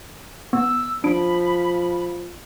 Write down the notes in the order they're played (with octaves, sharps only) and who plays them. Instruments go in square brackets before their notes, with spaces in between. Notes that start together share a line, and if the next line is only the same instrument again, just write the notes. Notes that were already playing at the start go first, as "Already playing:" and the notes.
[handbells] B3 [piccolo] E6
[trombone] F3 [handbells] D4 D7 [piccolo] B5